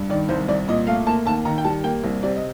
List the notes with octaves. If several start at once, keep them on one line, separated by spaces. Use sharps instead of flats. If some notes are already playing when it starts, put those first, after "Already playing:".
Already playing: G2
D#3 D5
C2 C5
C2 D5
A#2 D#5
A3 F5
A#3 A5
D#2 A5
D#3 A#5
G5
G3 A5
A#3 G5
C2
C3 D5
D#5